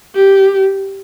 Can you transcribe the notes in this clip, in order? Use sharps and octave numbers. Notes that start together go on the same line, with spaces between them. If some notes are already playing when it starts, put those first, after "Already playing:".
G4